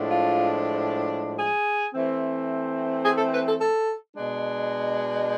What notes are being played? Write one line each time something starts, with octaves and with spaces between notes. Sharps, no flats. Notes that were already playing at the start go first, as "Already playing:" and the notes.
Already playing: A2 F3 G#3 D4
F4
G#4
E3 A3 C4
G#4
A4
B4
A4
A4
B2 G#3 D4